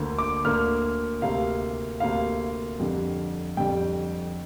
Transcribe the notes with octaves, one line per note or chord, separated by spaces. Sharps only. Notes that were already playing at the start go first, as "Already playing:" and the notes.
Already playing: D2 D3 A#3
D6
D2 D3 A#3 F6
D2 C3 A#3 F5
D2 C3 A#3 F5
F2 D3 G3
F2 D3 G3 G5